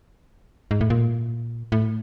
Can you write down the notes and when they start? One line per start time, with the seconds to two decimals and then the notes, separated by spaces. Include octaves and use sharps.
0.71 G#2
0.81 A2
0.90 A#2
1.72 A2